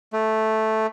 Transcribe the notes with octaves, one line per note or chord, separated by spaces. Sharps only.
A3